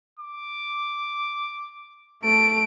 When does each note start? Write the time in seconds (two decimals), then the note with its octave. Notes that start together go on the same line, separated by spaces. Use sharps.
0.20 D6
2.23 A3 A5 D7